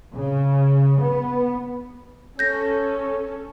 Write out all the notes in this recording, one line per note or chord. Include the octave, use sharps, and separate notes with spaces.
C#3
B3
C#4 A4 C#5 G6 A#6